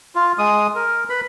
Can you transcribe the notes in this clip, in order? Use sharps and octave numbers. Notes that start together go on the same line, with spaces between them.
F4
G#3 D#6
A#4
B4 B5